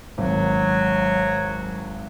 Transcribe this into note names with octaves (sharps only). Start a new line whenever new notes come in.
G#1 F#3